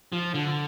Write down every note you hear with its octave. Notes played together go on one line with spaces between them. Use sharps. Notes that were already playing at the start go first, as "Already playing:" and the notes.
F3
D3